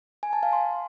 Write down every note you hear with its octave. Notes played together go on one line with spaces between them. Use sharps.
G#5
A5
F5
C6